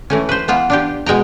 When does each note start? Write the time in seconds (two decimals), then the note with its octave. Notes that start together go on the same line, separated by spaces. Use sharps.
0.10 E3 A3 C#4
0.29 B4 C5
0.48 E3 B3 F4
0.70 D4 F4 G4
1.06 B2 G#3 G5 A#5